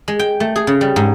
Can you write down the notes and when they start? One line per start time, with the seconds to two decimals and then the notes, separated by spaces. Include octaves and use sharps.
0.08 G#3
0.19 G5
0.40 A3
0.56 G#4
0.67 C#3
0.81 G3
0.96 G#2